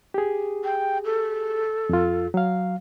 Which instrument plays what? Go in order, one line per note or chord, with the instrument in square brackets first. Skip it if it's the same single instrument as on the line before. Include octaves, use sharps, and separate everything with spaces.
[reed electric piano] G4 G#4
[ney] G5
A4
[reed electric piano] F2 F4
F#3 F5